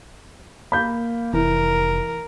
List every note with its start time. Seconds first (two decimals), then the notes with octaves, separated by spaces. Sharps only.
0.72 A#3 B5 G6
1.33 F1 E3 A#4